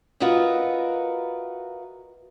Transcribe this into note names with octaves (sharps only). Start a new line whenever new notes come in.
F4 F#4 A#4 B4 D#5 E5